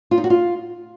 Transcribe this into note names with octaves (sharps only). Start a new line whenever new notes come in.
F4
D#4
F#4
F4